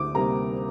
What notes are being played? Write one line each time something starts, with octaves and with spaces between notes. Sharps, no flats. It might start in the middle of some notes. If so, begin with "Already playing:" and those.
Already playing: D2 D6 D#6
C3 G3 A#3 A#5